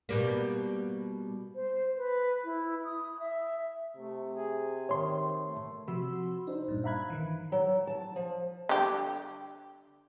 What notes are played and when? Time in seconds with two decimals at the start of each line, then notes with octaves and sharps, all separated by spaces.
0.09 B2 G3 A#3
1.55 C5
1.97 B4
2.44 E4
2.84 D#6
3.20 E5
3.97 C3 A3
4.36 G#4
4.89 D#3 C#5 C6
5.43 A3
5.88 C3 F3 F#4 B5 C6 E6
6.47 D4 D#4 C5
6.68 G2 A#2
6.84 E5 F5 A#5 B5 F#6 G#6
7.10 D#3 E3
7.52 F#3
7.87 A5
8.16 F3
8.69 D3 G3 G4